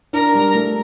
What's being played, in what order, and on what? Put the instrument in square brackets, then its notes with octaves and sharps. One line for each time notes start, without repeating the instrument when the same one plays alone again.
[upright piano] D4 [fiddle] A#4
[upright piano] G3
A3